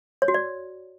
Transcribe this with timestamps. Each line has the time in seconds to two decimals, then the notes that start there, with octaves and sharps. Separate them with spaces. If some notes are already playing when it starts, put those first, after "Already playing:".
0.22 C#5
0.28 F#4
0.34 D5